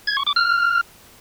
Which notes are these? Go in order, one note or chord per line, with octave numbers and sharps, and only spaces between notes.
G#6
C#6
D6
F6